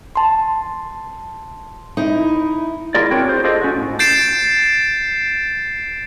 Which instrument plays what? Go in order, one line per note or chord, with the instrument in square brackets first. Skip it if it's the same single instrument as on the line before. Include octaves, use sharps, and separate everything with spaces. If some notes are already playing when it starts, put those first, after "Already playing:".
[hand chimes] A5 C6
[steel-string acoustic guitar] D#4 E4
[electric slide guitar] E4 F4 G#4 A#4 D5
C4 D4 F#4 A#4 C#5 G5
G#4 C5
D4 F4 G#4 A4 C5 D#5
C#4 F#4
A2
[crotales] G6 A6 C7 D7 E7